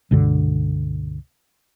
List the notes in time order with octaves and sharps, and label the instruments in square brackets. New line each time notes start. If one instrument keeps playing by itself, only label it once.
[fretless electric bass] C#2 G2 B2 D3